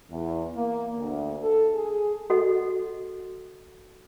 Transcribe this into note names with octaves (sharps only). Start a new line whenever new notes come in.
E2
A#3
D2
A4
G#4
F#4 A4 D#5 F#5